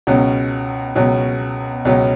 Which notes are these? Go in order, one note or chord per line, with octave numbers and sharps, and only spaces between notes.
C#2 B2 F#3 C#4
C#2 B2 F#3 C#4
C#2 B2 F#3 C#4